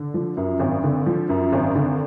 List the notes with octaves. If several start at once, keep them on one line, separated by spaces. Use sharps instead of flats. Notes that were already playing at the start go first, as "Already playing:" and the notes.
Already playing: D3
F3
F#2
G#1
D3
F3
F#2
G#1
D3